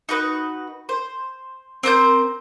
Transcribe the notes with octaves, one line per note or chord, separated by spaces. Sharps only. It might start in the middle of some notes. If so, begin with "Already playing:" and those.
D#4 F#4 B4
C5
C4 A#4 C5 G6